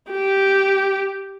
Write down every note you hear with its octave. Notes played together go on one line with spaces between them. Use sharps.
G4